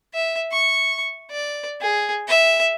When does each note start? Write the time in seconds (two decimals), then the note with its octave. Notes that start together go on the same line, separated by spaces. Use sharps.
0.14 E5
0.52 C#6
1.31 D5
1.81 G#4
2.28 E5